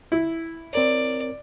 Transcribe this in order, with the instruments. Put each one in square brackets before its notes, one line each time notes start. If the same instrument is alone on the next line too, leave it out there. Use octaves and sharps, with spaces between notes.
[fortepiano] E4
[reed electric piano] C4 A#4 C#5 [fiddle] D5